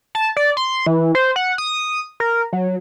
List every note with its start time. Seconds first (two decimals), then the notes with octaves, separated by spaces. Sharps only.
0.15 A5
0.37 D5
0.57 C6
0.87 E3
1.15 C5
1.36 F#5
1.58 D#6
2.20 A#4
2.53 F#3